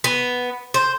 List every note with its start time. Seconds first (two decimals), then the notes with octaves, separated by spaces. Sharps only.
0.04 B3
0.74 C5